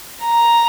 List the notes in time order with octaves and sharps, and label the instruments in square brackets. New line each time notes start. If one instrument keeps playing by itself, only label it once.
[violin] A#5